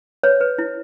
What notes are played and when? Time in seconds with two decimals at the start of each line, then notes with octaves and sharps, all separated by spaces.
0.23 B4 C#5
0.41 B4
0.58 E4